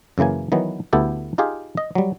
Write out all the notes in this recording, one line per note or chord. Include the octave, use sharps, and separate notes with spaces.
F#2 C#3 E3 A#3 G#5
D#3 E3 F#3 B3
D2 B3 E4 G4 A4
D#4 F4 G4 G#4 F5
D#5
F#3 G3